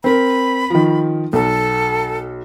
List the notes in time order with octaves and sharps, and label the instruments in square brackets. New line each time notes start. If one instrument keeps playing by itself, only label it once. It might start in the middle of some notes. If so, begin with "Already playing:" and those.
[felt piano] C4 A#4 [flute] B5
[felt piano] D#3 F3
[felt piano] B1 [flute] A4